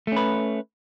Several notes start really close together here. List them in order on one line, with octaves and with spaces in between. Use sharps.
A3 C#4 B4